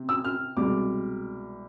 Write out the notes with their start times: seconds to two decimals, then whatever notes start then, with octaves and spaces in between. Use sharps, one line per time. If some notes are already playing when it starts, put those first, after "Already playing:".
Already playing: C3
0.09 E6
0.24 F6
0.57 C2 B2 G#3 D6